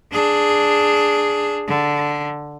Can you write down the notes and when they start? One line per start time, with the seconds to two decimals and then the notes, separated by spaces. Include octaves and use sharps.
0.12 D4 G#4
1.68 D3